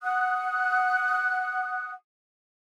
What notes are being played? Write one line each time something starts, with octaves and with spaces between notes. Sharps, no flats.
F#5 D#6 F#6